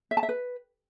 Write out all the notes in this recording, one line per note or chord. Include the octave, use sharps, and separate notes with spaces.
E5
A5
E5
B4